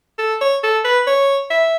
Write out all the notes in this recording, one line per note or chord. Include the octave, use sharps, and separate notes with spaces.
A4
C#5
A4
B4
C#5
E5